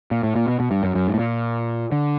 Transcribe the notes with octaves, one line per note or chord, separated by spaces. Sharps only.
A#2
A2
A#2
B2
B2
G2
F#2
F#2
G#2
A2
A#2
D3